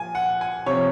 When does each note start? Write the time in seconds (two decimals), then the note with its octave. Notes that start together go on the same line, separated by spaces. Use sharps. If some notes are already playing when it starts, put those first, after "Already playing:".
Already playing: A#2 F3 G#5
0.15 F#5
0.41 G#5
0.66 C3 F3 C#5